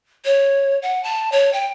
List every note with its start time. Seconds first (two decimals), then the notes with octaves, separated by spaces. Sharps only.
0.25 C#5
0.82 F#5
1.04 A5
1.32 C#5
1.53 G5